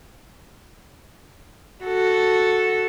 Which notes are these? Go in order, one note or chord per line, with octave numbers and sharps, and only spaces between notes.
F#4 A4